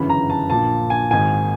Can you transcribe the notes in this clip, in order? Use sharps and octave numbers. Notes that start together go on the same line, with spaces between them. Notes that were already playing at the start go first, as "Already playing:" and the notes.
Already playing: G1 F#2 C#3 E3 B5
A#5
A5
A#1 A#2 A5
G#5
G#1 G#2 D#3 G#5